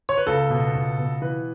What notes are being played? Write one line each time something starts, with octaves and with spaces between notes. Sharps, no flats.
C#5
B4
C#2 A4
B2
C#2
B2
E3 B4